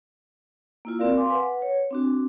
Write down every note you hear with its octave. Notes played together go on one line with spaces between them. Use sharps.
A#3 E4 F4
C4 F#4 A#4 D5 F5
F5 G#5 C6 D6
B4 F#5
C#5
C4 D4 F#4